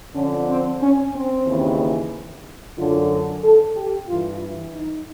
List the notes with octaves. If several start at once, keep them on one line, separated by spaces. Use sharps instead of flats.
F2 D3 C#4
C4
C#4
C4
D#2 C#3 E3
F#2 D3 F4
A4
G4
G2 E3 F4
E4
D#4